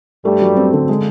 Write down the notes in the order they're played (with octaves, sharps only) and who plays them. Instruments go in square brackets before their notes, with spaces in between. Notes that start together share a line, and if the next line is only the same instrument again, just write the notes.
[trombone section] G2 G3 [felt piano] A3
[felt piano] F#3
C4
D3
G#3